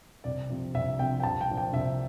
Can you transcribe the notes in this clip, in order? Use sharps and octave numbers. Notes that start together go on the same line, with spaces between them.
C2 D5
C3 F3
C2 E5
C3 F3 G5
G5
C2 A5
G5
A#2 F3
G5
C2 E5